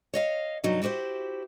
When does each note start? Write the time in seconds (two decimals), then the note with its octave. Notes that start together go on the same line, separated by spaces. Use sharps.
0.14 C#5 D#5 F5
0.64 G2 C3 F#3 D#4
0.82 E4 F#4 G4 B4 C5